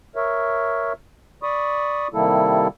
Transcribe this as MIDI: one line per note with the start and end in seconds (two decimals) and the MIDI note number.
0.16 0.93 70
0.16 0.93 73
0.16 0.93 76
1.43 2.08 74
1.43 2.08 83
1.43 2.08 85
1.43 2.08 87
2.14 2.68 48
2.14 2.68 51
2.14 2.68 55
2.14 2.68 58
2.14 2.68 64
2.14 2.68 69